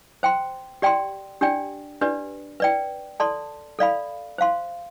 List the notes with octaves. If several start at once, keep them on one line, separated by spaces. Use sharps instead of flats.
C5 G5 C6
G4 D5 G5 C6
D4 G4 D5 G5
D4 G4 B4 D5
B4 D5 G5
A4 D5 A5 C6
A4 D5 F5 B5
C5 F5 C6